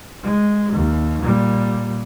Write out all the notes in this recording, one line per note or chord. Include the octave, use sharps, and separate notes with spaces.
G#3
D#2
A#2 G3